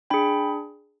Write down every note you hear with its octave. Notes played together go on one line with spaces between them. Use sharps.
D4 G#4 G5 B5